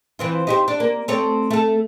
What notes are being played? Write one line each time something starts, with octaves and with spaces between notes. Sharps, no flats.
E3 C4 F4
D#4 G4 C5
D4
A#3
A3 C4 C#5
A3 A4